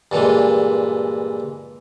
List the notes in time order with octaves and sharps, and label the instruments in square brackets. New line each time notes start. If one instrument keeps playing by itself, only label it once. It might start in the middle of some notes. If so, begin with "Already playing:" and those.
[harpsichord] G2 A#2 E3 G#3